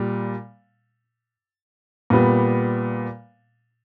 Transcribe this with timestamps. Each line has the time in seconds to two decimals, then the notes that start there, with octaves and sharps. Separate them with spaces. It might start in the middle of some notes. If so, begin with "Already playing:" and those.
Already playing: A#2 G3
2.10 A#2 G3 B3